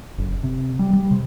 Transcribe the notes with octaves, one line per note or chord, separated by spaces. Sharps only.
F#1
C3
G3
G3
C3